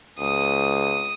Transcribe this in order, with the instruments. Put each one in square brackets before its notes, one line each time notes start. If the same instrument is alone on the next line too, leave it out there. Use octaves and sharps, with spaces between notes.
[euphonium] C#2 [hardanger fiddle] D#6